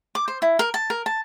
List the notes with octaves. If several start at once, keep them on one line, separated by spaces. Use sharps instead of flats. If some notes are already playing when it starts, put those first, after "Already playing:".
D6
C5
E4
A#4
A5
A#4
A5